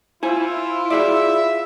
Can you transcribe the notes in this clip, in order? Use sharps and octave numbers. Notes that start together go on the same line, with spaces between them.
E4 F4 C5 G#5
F#4 G#4 D5 E5